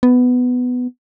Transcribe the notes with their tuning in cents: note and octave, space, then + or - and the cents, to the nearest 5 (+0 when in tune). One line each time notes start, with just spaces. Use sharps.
B3 +10